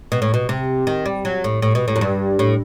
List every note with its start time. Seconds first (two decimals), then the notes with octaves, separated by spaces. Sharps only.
0.12 B2
0.22 A2
0.34 B2
0.49 C3
0.87 D#3
1.06 G3
1.25 F#3
1.44 A2
1.62 A2
1.75 B2
1.88 A2
1.96 F#2
2.01 G2
2.39 A2